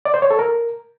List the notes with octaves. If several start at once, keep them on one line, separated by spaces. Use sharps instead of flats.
D5
C5
C#5
A4
A#4